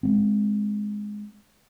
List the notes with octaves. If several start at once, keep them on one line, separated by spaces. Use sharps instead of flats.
G#3 A#3 C4